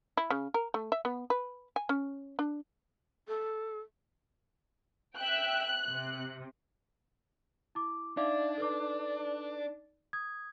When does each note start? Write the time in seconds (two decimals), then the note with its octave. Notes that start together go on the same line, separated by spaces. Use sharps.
0.17 E4
0.30 C#3
0.54 A#4
0.74 A3
0.92 E5
1.05 B3
1.30 B4
1.76 G#5
1.89 C#4
2.39 D4
3.28 A4
5.18 E5 G5 F#6
5.87 C3
7.75 E4 D6
8.17 D4 D#4 D5 E5 F5 D6
8.58 A4 B4 D6
10.13 D#6 G#6